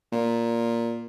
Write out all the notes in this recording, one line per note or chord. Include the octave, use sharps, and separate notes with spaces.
A#2